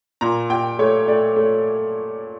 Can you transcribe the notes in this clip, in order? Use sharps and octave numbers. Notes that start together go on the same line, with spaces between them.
A#2 A#5
A#2 G5
A3 C#5
A3 D5
A3